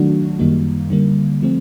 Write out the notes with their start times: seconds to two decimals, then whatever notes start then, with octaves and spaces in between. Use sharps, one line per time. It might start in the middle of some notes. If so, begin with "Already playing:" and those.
Already playing: D#3 F#3 A3 D4 F#4
0.39 F#2 D#3 G3 A#3 D#4
0.90 D3 G3 A#3
1.42 F3 A3 C4